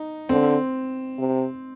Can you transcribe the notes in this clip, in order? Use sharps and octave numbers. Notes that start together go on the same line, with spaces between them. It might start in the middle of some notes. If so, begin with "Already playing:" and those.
Already playing: D#4
D3 C4
C3